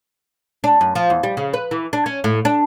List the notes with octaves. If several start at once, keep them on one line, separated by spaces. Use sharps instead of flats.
D4
F#2
F3
E2
G3
C#3
B4
E3
D4
C#4
A2
D4